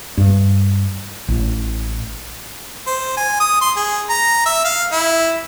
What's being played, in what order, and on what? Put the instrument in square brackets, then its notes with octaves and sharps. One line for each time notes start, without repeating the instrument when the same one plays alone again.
[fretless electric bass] G2
A1
[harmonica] C5
G#5
D#6
C6
G#4
A#5
E5
F5
E4